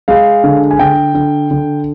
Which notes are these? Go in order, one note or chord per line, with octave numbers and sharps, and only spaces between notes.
G#3 F5
D3
G#5
D3 G5
D3
D3